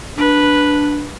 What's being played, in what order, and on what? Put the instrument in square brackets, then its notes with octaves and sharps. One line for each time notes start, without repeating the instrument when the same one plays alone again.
[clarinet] D4 [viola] B4